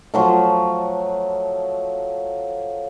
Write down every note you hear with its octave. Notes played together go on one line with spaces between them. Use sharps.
F3 F#3 A3